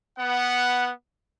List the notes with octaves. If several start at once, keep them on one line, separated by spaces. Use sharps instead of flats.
B3 F#5